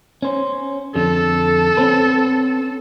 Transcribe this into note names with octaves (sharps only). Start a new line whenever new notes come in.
C#4 C5
F2 D3 A4
C4 C#4 B4